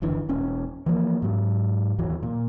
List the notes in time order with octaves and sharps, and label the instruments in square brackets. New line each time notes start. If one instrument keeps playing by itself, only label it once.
[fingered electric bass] F#1 D3 E3
E1 C#4
E3 F3 A#3
G#2 F#3
D#2 E3 F#3
A#2